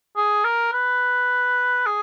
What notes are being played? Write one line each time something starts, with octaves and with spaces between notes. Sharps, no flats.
G#4
A#4
B4
G#4